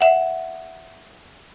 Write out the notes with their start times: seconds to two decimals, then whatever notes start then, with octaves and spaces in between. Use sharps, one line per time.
0.01 E5 F#5